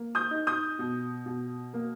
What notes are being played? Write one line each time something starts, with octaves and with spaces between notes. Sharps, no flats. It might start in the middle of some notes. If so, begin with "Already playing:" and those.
Already playing: A#3
D#6 G6
D#4
D#6 G6
B2
B2
A#3